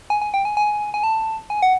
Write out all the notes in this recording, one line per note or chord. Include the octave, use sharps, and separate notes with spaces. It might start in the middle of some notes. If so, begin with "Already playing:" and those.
G#5
G#5
G5
G#5
G#5
G#5
A5
G#5
F#5